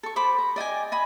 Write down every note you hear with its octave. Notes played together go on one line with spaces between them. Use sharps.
A4 C#6
C5 B5 D6
A#5
D5 D#5 G5 G#5
D#5 G#5 B5